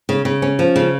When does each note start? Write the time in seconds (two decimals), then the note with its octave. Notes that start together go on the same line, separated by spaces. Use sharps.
0.09 C#3
0.25 C#3
0.42 C#4
0.59 F3
0.76 C#3